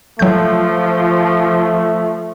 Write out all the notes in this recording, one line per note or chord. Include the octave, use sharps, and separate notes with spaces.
F3 F#3 A3 G6